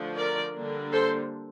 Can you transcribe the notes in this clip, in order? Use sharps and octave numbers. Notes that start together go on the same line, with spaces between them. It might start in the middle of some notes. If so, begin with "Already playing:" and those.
Already playing: D3 F3 A3 D4
A#4 D5
D3 G3 A#3 D4
A4 C5